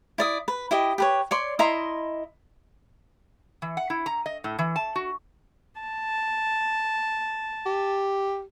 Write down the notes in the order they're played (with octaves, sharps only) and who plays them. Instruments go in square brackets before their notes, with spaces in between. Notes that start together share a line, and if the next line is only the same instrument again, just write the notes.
[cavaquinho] E4 D5 D#6
B4
E4 G4 D#5
G4 B4 C#5
C#5 D5 C6
E4 D#5 A#5 C6
[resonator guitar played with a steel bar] E3
F#5
E4
A#5
D#5
A2
E3
A5
F#4
[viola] A5
[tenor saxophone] G4